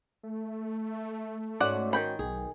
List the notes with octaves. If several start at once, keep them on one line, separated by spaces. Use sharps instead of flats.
A3
G#2 C#4 F#4 D5 F#5
D#3 G5 B5
B1 G#4